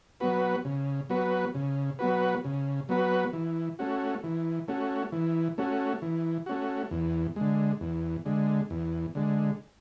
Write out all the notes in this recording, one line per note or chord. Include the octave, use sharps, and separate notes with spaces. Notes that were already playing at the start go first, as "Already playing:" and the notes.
F#3 B3 F#4 B4
C#3
F#3 B3 F#4 B4
C#3
F#3 B3 F#4 B4
C#3
F#3 B3 F#4 B4
E3
A3 C#4 F#4
E3
A3 C#4 F#4
E3
A3 C#4 F#4
E3
A3 C#4 F#4
E2
D3 G#3
E2
D3 G#3
E2
D3 G#3